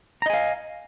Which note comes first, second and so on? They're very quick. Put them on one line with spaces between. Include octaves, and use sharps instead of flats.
A#5 D#5 G#5 F5